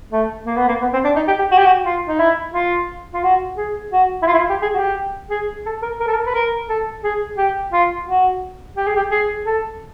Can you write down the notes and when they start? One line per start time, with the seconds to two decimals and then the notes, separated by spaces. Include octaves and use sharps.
0.12 A3
0.46 A#3
0.57 B3
0.68 A#3
0.82 B3
0.93 C4
1.04 D4
1.16 D#4
1.28 G4
1.39 G4
1.51 F#4
1.58 G4
1.66 F#4
1.85 F4
2.08 D#4
2.20 E4
2.54 F4
3.14 F4
3.24 F#4
3.58 G#4
3.93 F#4
4.22 E4
4.27 F4
4.34 E4
4.39 F4
4.50 G4
4.62 G#4
4.75 F#4
4.79 G4
5.31 G#4
5.66 A4
5.83 A#4
6.00 A#4
6.08 A4
6.14 A#4
6.26 B4
6.35 A#4
6.69 A4
7.04 G#4
7.38 G4
7.73 F4
8.07 F#4
8.77 G4
8.87 G#4
8.97 G4
9.11 G#4
9.46 A4